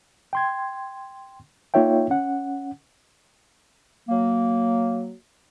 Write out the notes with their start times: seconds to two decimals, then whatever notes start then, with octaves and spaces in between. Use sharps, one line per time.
0.33 G5 C6 G#6
1.74 A#3 D#4 F4 C#5 E5 G5
2.10 C#4 F#5
4.09 F#3 A#3